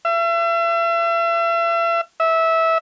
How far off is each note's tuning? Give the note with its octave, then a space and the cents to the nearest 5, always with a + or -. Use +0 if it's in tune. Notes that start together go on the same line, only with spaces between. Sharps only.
E5 +40
E5 -15